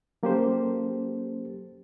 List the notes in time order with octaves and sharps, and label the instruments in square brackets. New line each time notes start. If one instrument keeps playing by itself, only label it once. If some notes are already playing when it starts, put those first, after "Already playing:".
[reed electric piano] F#3 A#3 C#4 G4 A4 C5